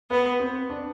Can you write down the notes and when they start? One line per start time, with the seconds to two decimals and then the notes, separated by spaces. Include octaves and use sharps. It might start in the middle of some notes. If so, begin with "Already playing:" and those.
0.11 B3 B4
0.40 C4
0.70 D4